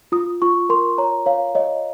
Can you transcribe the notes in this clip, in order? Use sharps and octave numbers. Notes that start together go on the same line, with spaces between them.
F4 D#6
F4 C#6
A#4 C6
C#5 A#5
C#5 F5
C#5 D#5